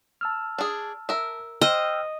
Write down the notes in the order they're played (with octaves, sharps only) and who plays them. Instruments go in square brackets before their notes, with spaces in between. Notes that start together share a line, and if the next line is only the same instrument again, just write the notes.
[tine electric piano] A5 E6 F6
[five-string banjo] D4 G#4
A#4 E5
[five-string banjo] C5 [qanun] D#5 [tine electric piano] G5 E6 F6